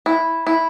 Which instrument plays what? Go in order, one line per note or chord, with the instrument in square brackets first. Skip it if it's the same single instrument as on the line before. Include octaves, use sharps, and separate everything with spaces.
[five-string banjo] E4
E4